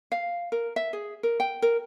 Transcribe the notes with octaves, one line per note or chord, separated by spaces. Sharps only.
F5
A#4
E5
G#4
A#4
G5
A#4